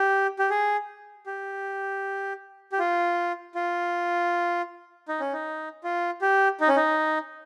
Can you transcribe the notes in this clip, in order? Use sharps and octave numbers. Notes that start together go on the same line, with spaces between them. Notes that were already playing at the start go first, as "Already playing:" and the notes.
Already playing: G4
G4
G#4
G4
G4
F4
F4
D#4
C#4
D#4
F4
G4
D#4
C#4
D#4